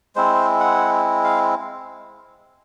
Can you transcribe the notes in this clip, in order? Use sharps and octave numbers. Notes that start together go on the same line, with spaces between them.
G#3 C4 E4 C5
F#5
F5